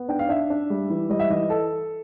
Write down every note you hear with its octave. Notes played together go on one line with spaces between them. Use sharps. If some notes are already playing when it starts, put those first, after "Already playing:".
Already playing: B3
D4 G5
F5
D4 E5
D4
G3
E3
G3 D#5
E5
E3 D#5
A4